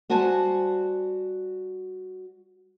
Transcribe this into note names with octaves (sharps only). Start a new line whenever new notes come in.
G3 F#4 C5 G#5 A5